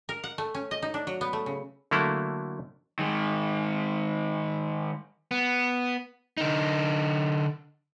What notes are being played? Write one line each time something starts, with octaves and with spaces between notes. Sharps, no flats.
A#4
F#5
A3
C#4
D#5
D#4
D4
F#3
B3
A3
C#3
D3 F#3 A3 A#3 E4
D#3 G#3
B3
D3 D#4